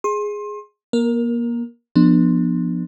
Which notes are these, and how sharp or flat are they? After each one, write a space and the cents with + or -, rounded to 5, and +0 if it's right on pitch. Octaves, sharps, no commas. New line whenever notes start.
G#4 +0 C6 +30
A#3 +30 A#4 +0
F3 +0 B3 -15 D4 +30